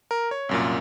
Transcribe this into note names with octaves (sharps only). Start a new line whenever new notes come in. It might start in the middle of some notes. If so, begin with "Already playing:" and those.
A#4
C#5
C2 F#2 A#2